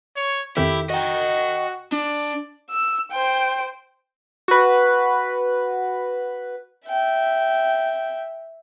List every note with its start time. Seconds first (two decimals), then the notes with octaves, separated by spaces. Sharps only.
0.17 C#5
0.57 F2 D#3 E4 G4 A4
0.90 F#4 D#5 G5
1.93 D4 D5
2.70 E6
3.11 C5 G5
4.48 F#4 B4
6.87 E5 G5